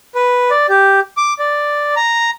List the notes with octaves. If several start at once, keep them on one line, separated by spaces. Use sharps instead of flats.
B4
D5
G4
D6
D5
A#5